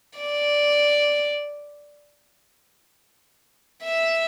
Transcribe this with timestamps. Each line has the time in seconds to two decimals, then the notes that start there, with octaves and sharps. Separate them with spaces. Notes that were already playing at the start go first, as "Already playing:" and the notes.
0.20 D5
3.84 E5